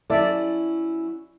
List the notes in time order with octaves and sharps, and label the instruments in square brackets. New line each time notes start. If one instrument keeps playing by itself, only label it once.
[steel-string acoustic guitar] F#3 C#4 E4 [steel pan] A4 D5 E5